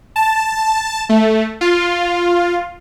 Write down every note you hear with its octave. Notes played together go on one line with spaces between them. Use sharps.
A5
A3
F4